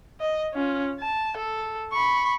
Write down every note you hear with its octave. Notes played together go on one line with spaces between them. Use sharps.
D#5
C#4 F4
A5
A4
B5 C#6